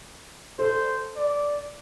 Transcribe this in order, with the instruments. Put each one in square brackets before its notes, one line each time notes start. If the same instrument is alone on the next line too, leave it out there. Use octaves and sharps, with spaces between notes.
[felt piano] A4 [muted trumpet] C5
[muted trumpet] D5